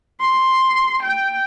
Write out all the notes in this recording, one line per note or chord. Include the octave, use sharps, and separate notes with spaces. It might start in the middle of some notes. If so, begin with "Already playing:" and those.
C6
G5